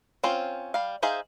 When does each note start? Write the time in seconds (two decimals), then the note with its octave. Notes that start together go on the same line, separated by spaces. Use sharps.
0.23 C4 C#4 F4 C5
0.74 G3 F5
1.02 D#4 G#4 C5 E5 F5